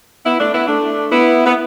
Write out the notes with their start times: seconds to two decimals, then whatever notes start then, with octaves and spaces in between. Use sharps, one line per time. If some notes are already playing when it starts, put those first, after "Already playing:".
0.25 B3 E4
0.39 A3 D4
0.53 B3 E4
0.67 A3 D4
1.11 B3 E4
1.46 B3